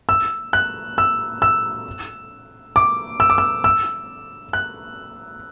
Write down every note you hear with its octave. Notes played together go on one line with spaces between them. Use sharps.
E6
F#6
E6
E6
D6
E6
D6
E6
E6
F#6